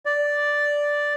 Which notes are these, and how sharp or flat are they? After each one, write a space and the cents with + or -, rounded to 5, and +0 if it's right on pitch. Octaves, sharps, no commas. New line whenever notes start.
D5 -5